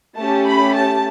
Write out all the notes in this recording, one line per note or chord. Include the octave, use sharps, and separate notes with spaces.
A3 C#4 G4 A5
B5
A5